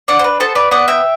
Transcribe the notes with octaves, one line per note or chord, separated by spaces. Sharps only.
D4 D5 F#5
C5
B4
B3 A4 C5
B4 D5
B3 D5 F#5
E5 G5